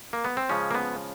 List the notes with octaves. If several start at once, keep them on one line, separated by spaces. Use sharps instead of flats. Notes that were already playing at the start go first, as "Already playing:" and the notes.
A#3
B3
C4
C#3 F3 G#3 C#4
A#3
B3